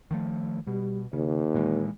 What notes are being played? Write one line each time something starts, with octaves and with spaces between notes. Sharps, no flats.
D#3 F3 A3
B2 G3
D#2 C#3
A#2 E3 G#3